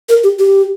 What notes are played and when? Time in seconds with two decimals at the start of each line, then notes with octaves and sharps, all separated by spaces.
0.09 A#4
0.23 G4
0.39 G4